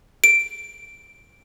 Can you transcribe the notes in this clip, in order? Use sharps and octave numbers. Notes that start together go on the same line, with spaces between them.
D7